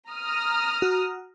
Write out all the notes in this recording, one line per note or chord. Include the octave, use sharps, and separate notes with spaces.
A#5 D#6 F6
F#4